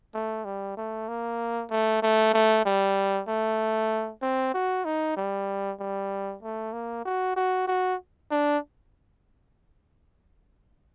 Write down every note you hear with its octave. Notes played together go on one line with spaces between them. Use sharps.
A3
G3
A3
A#3
A3
A3
A3
G3
A3
C4
F#4
D#4
G3
G3
A3
A#3
F#4
F#4
F#4
D4